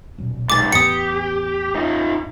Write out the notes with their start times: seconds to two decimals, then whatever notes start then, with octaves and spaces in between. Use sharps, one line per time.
0.18 D#1 B1
0.50 G2 D#3 D6 A6
0.72 E2 A2 B3 G4 D#6 C#7
1.75 D#4 F4